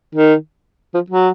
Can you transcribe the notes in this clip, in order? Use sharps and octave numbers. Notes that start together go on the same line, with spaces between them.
D#3
F3
F#3